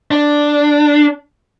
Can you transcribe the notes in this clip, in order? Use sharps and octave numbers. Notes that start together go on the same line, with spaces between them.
D4